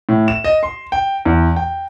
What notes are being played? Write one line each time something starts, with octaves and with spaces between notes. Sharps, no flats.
A2
E7
D#5
C6
G5
E2
G5